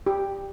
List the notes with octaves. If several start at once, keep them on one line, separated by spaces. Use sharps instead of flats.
G4